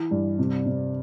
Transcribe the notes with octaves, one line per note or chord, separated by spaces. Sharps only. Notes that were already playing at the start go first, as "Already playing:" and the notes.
Already playing: E3
G2
C3
C3